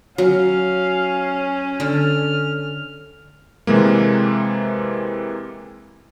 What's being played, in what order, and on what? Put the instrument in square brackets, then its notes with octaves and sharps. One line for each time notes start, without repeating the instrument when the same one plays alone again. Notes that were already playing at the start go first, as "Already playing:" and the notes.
[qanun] F#3 [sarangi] C#4 [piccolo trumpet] F5
[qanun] D3 A4 [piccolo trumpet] F6
[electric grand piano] C3 E3 G#3 A#3